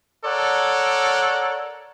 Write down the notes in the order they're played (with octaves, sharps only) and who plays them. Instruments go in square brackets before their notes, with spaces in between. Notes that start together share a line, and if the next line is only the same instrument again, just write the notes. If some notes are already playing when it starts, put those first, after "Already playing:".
[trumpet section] A4 A#4 C#5 D5 F#5